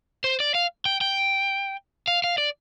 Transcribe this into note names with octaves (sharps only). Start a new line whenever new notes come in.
C5
D5
F5
G5
G5
F5
F5
D5